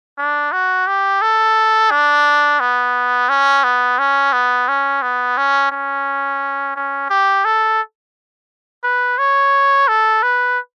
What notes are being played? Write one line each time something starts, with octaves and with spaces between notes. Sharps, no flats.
D4
F#4
G4
A4
D4
B3
C#4
B3
C#4
B3
C#4
B3
C#4
C#4
C#4
G4
A4
B4
C#5
A4
B4